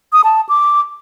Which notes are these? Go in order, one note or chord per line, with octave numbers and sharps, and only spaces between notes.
D#6
A5
D6